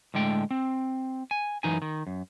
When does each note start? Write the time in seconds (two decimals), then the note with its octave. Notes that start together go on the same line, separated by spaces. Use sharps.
0.14 A2 D3 G#3 G5
0.51 C4
1.31 G#5
1.63 F#2 E3 D#4 G#5
1.82 D#3
2.07 F#2